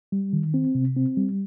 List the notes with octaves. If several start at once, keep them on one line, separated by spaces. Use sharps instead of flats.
G3
D#3
C4
C3
C4
G3